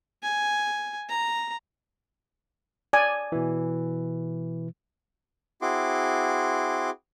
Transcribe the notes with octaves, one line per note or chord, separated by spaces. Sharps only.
G#5
A#5
D5 G#5
B2 E3
C4 E4 F#4 G#4 C6 D6